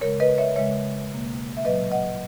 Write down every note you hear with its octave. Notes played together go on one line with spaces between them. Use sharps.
C#3 G#3 A#4 C#5
B4 D#5
C#5 E5
C#3 G#3 C#5 E5
B2 A#3
E5
A#2 F#3 A#3 B4 D#5
D#5 F#5